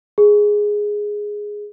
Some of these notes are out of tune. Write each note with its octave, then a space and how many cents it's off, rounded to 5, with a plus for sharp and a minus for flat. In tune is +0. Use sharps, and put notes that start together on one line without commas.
G#4 +0